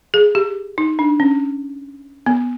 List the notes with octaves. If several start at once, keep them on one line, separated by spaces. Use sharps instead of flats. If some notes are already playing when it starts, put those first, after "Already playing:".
G#4
G4
D#4
D4
C#4
B3